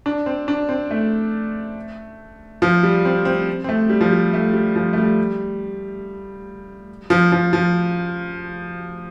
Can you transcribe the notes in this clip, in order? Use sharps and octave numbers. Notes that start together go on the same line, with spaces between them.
D4
C4
D4
C4
A3
F3
G3
C4
C4
C4
A3
G3
F3
G3
A3
G3
F3
A3
G3
F3
F3
F3